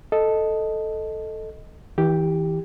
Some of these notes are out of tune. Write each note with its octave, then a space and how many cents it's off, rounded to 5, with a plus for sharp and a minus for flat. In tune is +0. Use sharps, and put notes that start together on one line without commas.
A4 +0 D#5 +0
E3 -35 G4 +0